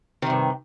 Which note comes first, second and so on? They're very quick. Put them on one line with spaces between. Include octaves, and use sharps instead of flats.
D#3 C3 G2